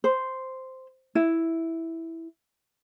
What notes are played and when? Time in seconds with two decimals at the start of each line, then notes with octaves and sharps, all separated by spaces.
0.04 C5
1.15 E4